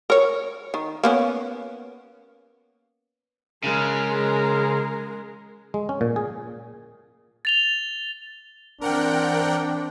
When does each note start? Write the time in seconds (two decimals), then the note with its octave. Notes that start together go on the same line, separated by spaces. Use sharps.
0.10 A#4 C#5
0.74 D#3
1.04 A#3 B3 C#4
3.64 C#3 G#3 A#4
5.74 G#3
5.89 C#4
6.01 A#2
6.16 G#4
7.45 A6 F7 G7
8.81 E3 C4 D4 A#4 F#5 G5